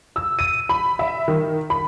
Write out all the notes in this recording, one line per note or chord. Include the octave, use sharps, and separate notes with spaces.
E6
D#7
B5
E5
D#3
B5